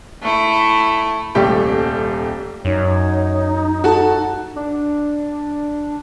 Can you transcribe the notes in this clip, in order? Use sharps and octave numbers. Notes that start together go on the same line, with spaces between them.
A3 E4
D#1 C2 A3 G4 G5
F#2 D#4 C#5
F#4 A4 F#5 A5
D4